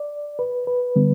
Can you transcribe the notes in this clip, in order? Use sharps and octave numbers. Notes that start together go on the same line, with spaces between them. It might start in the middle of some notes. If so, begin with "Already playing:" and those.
Already playing: D5
B4
B4
D3 G3 B3